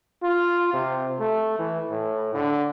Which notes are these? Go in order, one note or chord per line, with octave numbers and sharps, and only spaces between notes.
F4
C3
A3
E3
A2
D3